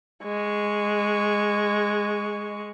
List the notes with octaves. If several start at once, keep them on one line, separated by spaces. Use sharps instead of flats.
G#3 C#6